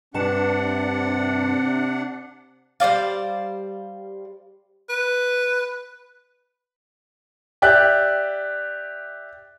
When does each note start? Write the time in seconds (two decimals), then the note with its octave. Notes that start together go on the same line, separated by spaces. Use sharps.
0.14 G2 C3 C4 D4 F#5 A5
2.80 G3 C5 D5 F5
4.89 B4
7.62 G4 D5 E5 F#6